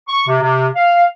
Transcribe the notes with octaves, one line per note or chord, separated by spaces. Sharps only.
C#6
C3
C3
F5